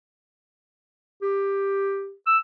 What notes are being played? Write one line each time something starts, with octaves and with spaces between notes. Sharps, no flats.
G4
E6